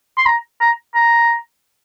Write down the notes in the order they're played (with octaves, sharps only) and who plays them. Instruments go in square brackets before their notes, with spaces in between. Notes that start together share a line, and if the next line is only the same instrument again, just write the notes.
[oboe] C6
A#5
A#5
A#5